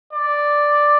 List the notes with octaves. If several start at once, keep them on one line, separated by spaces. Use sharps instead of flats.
D5